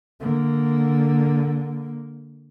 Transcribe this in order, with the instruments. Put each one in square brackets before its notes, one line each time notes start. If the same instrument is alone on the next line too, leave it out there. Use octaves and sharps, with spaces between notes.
[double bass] D3 A#3